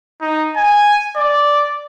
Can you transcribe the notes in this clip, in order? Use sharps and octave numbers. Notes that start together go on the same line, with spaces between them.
D#4
G#5
D5